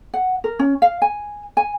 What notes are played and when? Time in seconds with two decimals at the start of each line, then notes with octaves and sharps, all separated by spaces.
0.14 F#5
0.44 A#4
0.59 C#4
0.82 F5
1.02 G#5
1.57 G#5